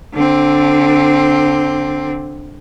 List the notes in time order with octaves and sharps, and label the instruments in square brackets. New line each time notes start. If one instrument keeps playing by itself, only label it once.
[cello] D3 C4